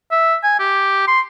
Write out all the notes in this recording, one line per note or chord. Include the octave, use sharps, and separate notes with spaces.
E5
G#5
G4
C6